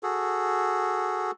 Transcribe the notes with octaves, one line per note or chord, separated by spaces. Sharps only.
F#4 G#4 A4